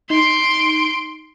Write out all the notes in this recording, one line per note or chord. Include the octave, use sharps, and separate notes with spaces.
D#4 C6 D7